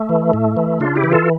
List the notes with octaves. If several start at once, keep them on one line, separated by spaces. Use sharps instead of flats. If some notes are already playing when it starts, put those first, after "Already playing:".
Already playing: A3
E3
A2
E3
C#3 D4 F4
E4 G4
E3
F4 A4